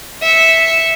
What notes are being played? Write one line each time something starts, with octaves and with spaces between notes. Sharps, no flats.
E5 C#7